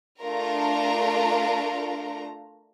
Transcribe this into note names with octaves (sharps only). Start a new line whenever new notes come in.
A3 D4 F4 A#4 A#5